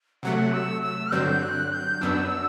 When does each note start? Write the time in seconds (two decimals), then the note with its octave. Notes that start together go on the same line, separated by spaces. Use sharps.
0.23 C3 F#3 A3 F#5
0.53 E6
0.82 E6
1.12 G2 D3 F#3 C4 G6
1.42 F#6
1.72 G6
2.01 F#2 F#3 B3 D4 E6